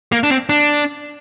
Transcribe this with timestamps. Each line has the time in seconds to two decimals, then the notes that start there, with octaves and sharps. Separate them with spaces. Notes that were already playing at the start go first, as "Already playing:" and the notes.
0.12 A#3
0.23 D4
0.30 C4
0.49 D4